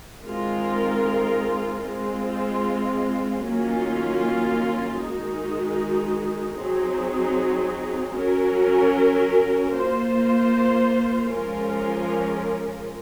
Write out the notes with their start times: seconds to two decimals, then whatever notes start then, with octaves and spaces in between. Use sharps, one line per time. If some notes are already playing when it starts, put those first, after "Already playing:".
0.23 D#3 G#3 C4 F4 A#4
1.82 G#3 C4 F4
3.40 D#3 F#3 A#3 C#4 F4
4.97 D#3 G#3 D#4 F#4
6.56 F#3 C4 D#4 G#4
8.14 F#3 C#4 F#4 A#4
9.72 A#3 F4 C5
11.30 F3 G#3 C#4 F4 A#4